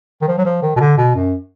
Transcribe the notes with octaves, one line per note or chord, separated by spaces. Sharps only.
D#3
F3
F#3
F3
D#3
B2
D3
B2
F#2